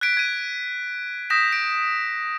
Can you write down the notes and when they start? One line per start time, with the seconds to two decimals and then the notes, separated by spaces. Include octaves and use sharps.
0.01 F#6 G#6 B6 D7
0.17 G#6 D#7
1.30 D#6 G6 A#6 B6 E7
1.53 D7